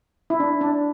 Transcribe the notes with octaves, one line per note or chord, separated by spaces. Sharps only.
E4
D4
D4